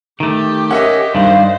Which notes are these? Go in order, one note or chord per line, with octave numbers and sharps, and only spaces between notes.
D#3 A3 G4
C#4 A#4 D#5 E5 F#5
G2 D#3 G3 C5 F5